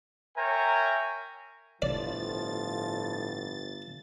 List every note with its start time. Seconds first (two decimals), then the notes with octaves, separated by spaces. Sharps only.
0.37 A#4 C#5 E5 G5 G#5 A#5
1.82 G1 A2 F3 D5 A6